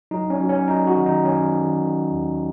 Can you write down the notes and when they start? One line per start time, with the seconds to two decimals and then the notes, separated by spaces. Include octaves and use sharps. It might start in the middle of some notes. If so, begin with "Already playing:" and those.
0.11 F#3 D#4
0.30 C#4
0.40 F#3
0.49 C#4
0.68 F#3 D#4
0.87 F#4
0.97 D#3
1.06 D#4
1.25 D#3 C#4
1.54 D#3
1.81 D#3
2.11 D#2